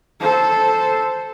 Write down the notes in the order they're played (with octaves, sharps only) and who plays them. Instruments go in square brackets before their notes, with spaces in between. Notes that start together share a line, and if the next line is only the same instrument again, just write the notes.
[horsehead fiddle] A4 C5